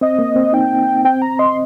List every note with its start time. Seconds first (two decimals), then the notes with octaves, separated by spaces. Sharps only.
0.01 C4 D#5
0.19 A#3
0.36 C4
0.53 D#4 G5
1.05 C4 G5
1.22 A#5
1.39 D#5 C6